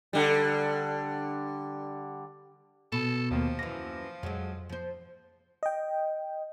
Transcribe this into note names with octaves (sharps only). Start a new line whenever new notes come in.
D3 G3
B2 A4
D#2 D#3 F3 A#3
F#2 E3 D6 A#6
F2 F#3 G#3
F3 C5
D#5 G5